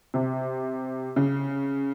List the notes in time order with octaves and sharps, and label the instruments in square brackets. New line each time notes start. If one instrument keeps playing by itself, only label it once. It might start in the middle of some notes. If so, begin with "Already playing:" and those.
[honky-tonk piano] C3
C#3